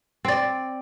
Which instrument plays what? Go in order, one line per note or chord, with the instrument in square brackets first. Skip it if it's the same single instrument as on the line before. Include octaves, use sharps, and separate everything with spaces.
[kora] C4 D5